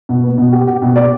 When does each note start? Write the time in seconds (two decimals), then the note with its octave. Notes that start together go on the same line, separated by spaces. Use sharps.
0.09 B2
0.23 B3
0.38 B2
0.52 G4
0.67 G4
0.82 B2
0.96 D5